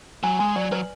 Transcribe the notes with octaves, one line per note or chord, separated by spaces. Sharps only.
F#3 G#5
G#3 G#5
F#3 D5
F#3 B4